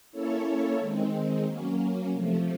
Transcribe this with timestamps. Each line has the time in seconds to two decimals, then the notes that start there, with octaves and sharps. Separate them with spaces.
0.12 A#3 C#4 E4 A4 C#5
0.78 D#3 G#3 C4
1.45 F#3 A#3 C#4
2.12 C3 F3 A3